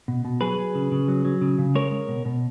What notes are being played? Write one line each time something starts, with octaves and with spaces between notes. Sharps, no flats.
B2
B2
F#3 G#4 B4
F#3
C#3
C#3
F#3
F#3
C#3
C#3
G#3 A#4 C#5
G#3
B2
B2